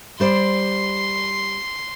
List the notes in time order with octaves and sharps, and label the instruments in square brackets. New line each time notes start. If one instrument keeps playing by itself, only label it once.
[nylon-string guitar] G3 C5 D5 [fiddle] C6